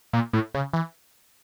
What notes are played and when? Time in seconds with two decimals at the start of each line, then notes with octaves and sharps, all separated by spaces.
0.13 A#2
0.33 A2
0.54 C#3
0.73 E3